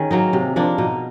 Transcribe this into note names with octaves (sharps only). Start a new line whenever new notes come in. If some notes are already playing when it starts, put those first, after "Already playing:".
Already playing: D#3 C#4 G#4
F#3 A#3 D#4
C3
F3 A#3 D4
B2 D#4